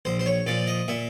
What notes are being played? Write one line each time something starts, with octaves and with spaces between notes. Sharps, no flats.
A#1 C5
C5
C#5
A#2 F3 D5
D#5
A#2 E5